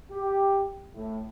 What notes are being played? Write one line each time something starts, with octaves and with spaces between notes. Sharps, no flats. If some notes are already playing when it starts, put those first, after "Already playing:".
G4
A2